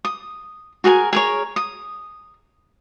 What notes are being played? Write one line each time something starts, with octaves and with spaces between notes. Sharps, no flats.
D#6
F#4 G#4 A#4 G#5
G#4 A#4 C#5
D#6